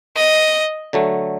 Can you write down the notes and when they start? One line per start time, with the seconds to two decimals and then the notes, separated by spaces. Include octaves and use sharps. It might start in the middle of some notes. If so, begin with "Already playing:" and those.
0.16 D#5
0.93 D3 F#3 A3